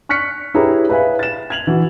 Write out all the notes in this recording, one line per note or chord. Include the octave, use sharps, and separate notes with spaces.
C#6 F6 F#6 B6 C#7
E4 G4 G#4 B4 C#5 A#5
B4 E5 F5 G#5 B5
A6 E7
G#6 F7 F#7
E3 F#4